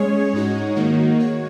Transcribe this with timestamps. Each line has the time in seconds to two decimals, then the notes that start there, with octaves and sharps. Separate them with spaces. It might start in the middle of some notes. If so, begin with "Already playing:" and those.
Already playing: G#3 C#4 G#4 C#5
0.34 G#2 G#3 D#4 F#4 C#5
0.76 D#3 A#3 D#4 F#4
1.20 G#3 F#4 C#5